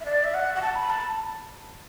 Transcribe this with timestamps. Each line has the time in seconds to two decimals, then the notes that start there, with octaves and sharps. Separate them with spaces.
0.01 E5
0.05 D5
0.24 E5
0.34 F#5
0.55 F#5
0.62 A5
0.75 B5
0.90 A5